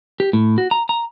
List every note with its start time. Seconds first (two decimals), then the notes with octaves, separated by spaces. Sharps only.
0.20 G4
0.33 A2
0.58 F#4
0.71 A#5
0.89 A#5